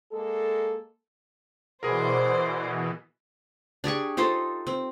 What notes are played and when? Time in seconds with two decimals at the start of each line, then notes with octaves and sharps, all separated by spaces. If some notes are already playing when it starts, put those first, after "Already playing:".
0.12 G#3 A#3 A4
1.83 B2 E3 G#4 A#4 C5 D5
3.84 D4 G4 G#4 C#6
4.17 D#4 F4 A4 C5
4.67 C4